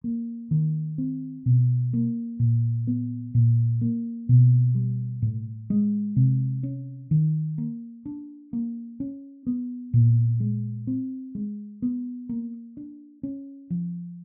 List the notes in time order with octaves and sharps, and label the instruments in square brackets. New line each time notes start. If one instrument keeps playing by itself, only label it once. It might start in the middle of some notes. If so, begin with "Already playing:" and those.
[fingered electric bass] A#3
D#3
C4
B2
A#3
A#2
B3
A#2
A#3
B2
G3
A2
G#3
C3
C#4
D#3
A#3
D4
A#3
C#4
B3
A#2
G#3
C4
G#3
B3
A#3
D4
C#4
F3